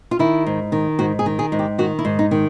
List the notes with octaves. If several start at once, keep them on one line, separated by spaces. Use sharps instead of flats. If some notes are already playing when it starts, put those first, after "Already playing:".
F4
D#3 E4
G#2
D#3
G#2 F#4
G#4
D#3
G#4
G#2
G4
D#3 F#4
E4
G#2
D#4
D#3